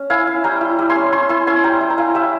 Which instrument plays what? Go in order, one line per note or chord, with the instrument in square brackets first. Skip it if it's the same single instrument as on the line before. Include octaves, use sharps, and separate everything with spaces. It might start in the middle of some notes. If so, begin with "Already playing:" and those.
Already playing: [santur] C#4
E4 F5 G#5
E4
G3 G5 A#5
E4
G3
G#5 C6
C#4
C#4 G#5 C6
E4 G#5 C6
C#4 G#5 C6
G3 G5 A#5
E4
A#5
E4 F5 G#5
G3 E5 G5